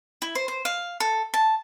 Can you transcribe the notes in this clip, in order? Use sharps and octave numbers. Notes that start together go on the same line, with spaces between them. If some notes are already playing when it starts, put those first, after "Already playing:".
E4
C5
C5
F5
A4
A5